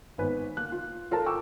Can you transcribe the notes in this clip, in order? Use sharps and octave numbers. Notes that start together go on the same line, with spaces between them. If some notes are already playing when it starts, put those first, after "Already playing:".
G#1 B3 B4 G#5
A#3 F#6
F4
F4 A4 A#4 A5 A#5
G5 C#6 D6 E6